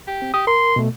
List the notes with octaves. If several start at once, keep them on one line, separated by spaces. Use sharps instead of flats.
G4
C4
G4 D#6
A#4 C6
B2 A3